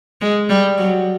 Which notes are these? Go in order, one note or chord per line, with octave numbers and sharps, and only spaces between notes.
G#3
G3
F#3